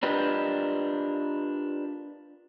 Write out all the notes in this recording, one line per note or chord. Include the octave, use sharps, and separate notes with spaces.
D4 F4 G4 A#4 B4 D#5